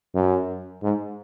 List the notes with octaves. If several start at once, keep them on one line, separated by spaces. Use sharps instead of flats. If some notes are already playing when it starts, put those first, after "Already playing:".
F#2
G#2